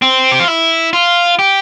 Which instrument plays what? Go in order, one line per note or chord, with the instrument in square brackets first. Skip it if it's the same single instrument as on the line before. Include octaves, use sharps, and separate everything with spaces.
[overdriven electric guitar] C4
G4
F4
E4
F4
G4